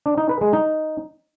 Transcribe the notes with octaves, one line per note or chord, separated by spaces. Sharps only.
D4
D#4
B4
G#3
D#4